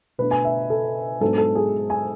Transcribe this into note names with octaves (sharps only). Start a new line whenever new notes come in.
B2 A3 D4 B4
G#5
E5
A4
G#2 F#3 B3 D4 A4
A4
G#4
G#5